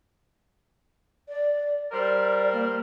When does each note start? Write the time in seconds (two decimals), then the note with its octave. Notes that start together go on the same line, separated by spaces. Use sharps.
1.29 D5
1.92 G3 A#4 C5 D5
2.53 A#3